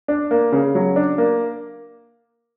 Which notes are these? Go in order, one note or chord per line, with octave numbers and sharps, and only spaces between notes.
D4
A#3
C#3
F#3
D4
A#3